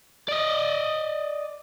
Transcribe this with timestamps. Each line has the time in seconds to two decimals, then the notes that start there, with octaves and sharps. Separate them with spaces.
0.28 D5 D#5